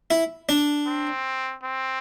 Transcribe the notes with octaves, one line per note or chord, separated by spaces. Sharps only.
E4
D4
C4
C4